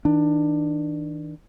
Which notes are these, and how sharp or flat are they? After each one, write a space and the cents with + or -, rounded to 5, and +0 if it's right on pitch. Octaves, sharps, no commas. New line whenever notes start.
D#3 +45 D4 +20